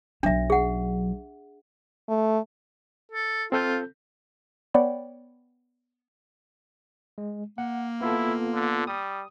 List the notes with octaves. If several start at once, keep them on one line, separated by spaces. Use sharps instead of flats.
B1 F#3 D4 E5
G#4 F#5
A3
A4
C4 F4 A4 G6
B3 C#5 D5 F#5 G5 B5
G#3
A#3 F#5
B3 E4 F4 A4
D3
G3 D#6